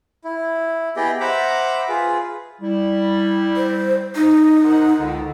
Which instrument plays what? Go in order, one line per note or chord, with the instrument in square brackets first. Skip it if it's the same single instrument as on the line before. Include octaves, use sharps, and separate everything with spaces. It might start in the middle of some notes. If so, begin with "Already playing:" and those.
[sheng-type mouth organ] E4
B3 E4 G4 G#4 D#5 G5
C5 E5 F#5 A#5 B5 D6
F4 G#4 B4
[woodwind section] G3 E4
[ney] C5
D#4
[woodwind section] A#4 C5 F#5
C#2 D3